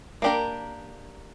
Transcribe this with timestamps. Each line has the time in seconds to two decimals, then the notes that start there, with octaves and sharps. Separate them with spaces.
0.22 A#3 D4 G4 A#4